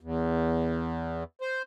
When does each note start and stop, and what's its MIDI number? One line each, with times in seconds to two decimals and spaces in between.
0.01 1.24 40
1.41 1.62 72